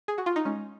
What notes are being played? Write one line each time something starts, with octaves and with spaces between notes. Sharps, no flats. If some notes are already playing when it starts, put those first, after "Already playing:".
G#4
F#4
F4
D#4
G#3 C#4